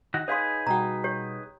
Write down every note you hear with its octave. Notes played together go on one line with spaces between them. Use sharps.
D#3 F#4
D#4 G#4 B4 C#5 F5 C6
B2 G3 F#4 G5 A#5
G4 C#5